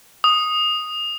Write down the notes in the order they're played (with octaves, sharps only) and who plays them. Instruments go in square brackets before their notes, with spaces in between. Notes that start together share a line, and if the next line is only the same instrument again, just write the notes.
[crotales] D#6